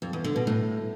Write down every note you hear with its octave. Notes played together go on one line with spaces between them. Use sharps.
F2
E2
D3
B2
A2